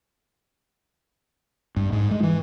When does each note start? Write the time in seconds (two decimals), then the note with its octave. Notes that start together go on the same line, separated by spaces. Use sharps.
1.76 G2
1.92 G#2
2.11 G#3
2.23 E3